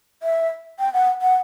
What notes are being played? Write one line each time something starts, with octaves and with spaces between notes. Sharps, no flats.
E5
G5
F#5
F#5